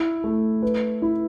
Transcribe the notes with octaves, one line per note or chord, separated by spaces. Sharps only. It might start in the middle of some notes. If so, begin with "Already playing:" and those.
Already playing: E4
A3
B4
E4